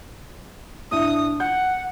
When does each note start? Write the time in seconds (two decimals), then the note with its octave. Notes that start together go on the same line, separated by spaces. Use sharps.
0.91 A2 D4 E5 D#6
1.40 F#5 G6